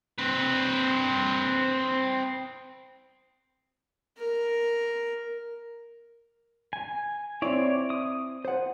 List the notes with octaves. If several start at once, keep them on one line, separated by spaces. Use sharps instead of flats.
C4 B4
A#4
G#5
C4 E4 C#5 D5
D#6
C5 F#5